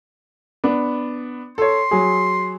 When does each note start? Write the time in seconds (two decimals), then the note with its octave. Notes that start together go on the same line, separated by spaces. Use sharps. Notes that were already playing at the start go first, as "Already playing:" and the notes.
0.64 B3 D4
1.58 A4 C#5 C6
1.91 F#3 G#4